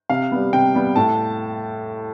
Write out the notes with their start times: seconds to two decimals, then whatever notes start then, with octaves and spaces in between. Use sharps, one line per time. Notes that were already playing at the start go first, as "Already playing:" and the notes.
0.10 C3 F5
0.32 G3 B3
0.53 C3 G5
0.75 G3 B3
0.96 A2 A5